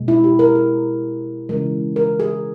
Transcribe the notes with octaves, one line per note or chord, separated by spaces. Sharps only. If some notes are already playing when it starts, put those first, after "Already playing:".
Already playing: B2 G#3
E4
G4
A#4
G#4
C#3 E3 G#3 A#4
A#4
G#4